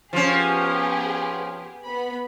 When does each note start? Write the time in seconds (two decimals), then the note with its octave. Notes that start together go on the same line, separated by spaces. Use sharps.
0.13 F3 B3 C#4 G4 G#4
1.83 B3 B5